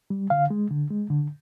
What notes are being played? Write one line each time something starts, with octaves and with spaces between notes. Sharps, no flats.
G3
D3 F5
G#3
D3
G#3
D3